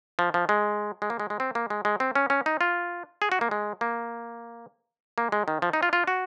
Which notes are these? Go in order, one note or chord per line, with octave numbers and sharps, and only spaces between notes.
F3
F3
G#3
G#3
A#3
G#3
G#3
C4
A#3
G#3
G#3
C4
C#4
C#4
D#4
F4
G#4
F#4
A#3
G#3
A#3
A#3
G#3
D#3
F3
D#4
F4
F4
F#4